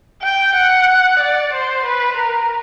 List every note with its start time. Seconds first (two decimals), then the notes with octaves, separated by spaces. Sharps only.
0.23 G5
0.56 F#5
1.20 D5
1.53 C5
1.85 B4
2.17 A#4